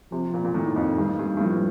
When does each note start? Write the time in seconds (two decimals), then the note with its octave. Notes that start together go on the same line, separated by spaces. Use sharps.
0.12 C3 F3
0.34 A#2
0.45 A#2
0.54 A2 D#3
0.76 F2
0.98 G2 D#3
1.19 G2
1.37 G2
1.41 A2 F3